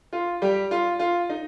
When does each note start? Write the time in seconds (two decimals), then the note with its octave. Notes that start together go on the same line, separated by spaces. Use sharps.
0.13 F4
0.42 G3 G4
0.71 F4
0.99 F4
1.29 D#4